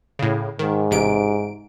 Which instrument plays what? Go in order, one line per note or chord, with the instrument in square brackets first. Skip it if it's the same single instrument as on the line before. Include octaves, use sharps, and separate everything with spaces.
[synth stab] A2 C#3
[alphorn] G#2 [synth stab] D#3
[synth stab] A1 C3 D7